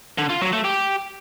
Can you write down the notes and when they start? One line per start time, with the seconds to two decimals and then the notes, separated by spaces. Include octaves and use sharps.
0.18 D3
0.30 F4
0.41 F#3
0.53 A3
0.64 G4